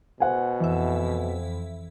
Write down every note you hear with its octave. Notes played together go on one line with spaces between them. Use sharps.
B2 C5 F#5 G#5
F2 E3 E5